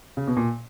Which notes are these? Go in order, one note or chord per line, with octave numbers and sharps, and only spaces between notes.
C#3
B2
A#2